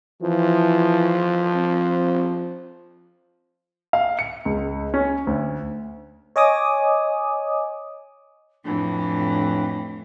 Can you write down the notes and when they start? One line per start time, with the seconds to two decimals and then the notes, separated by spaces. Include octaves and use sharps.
0.22 E3 F3
1.54 C4
3.93 F5
4.19 C#7
4.45 C#2
4.94 C#4
5.27 D2
6.36 C#5 D#5 G#5 D6 D#6
8.64 F2 A2 E3 D4